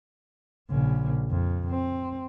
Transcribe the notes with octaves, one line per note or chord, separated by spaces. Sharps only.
A#1 C#3
F2
C4